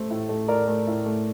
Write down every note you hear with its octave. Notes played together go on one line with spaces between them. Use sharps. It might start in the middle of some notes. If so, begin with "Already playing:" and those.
Already playing: A3 A4 C5
A2
A3
A2 A#4 D5
A3
A2
A3